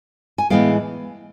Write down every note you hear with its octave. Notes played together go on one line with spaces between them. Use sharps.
G#5
A2 E3 G#3 B3 F5 G5